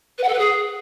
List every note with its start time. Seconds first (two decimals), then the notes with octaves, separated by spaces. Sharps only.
0.18 B4
0.23 F#5
0.28 A4
0.34 B4
0.39 G#4